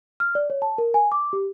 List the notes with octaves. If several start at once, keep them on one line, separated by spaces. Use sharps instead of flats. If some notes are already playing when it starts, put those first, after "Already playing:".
F6
D5
C#5
A5
A#4
G#5
D6
G4